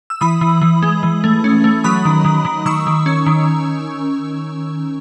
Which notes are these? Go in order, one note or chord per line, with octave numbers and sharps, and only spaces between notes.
E6
E3 B5 D#6
E3
E3
G#3
E3
A3
C#4
A3
F#3 B5 D#6
D#3
D#3
D#3
D#3 C#6 E6
D#3
C#4
D#3